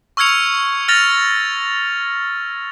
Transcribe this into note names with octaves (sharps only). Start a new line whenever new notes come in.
C#6 E6 F6 G#6 C#7 F7
F6 A6 A#6 F7